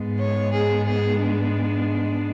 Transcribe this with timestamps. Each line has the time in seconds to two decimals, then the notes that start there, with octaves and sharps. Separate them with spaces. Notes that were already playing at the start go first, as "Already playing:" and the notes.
Already playing: G#2 G#3 B3
0.19 C#5
0.53 G#4
0.87 G#4
1.22 D4